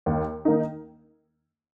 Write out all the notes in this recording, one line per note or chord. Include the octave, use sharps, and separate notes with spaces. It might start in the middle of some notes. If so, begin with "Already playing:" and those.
D#2
D#3 A#3 D#4